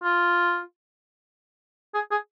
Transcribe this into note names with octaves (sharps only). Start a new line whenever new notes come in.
F4
G#4
G#4